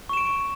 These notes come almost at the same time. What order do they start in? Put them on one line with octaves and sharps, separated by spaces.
C#6 E7 D7